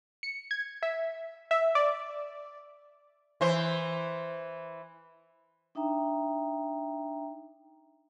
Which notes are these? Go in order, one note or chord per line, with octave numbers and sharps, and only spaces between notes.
C#7
G#6
E5
E5
D5
E3 C5
D4 D#4 E5 G5 A#5